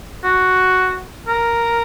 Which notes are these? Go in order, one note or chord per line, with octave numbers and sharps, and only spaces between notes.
F#4
A#4